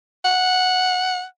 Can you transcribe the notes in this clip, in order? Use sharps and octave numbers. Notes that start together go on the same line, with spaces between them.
F#5